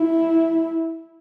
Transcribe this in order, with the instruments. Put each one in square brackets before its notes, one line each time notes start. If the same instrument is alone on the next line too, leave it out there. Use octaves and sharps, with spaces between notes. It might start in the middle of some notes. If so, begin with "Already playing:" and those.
Already playing: [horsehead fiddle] E4